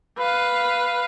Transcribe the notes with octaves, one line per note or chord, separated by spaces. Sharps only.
B4 F5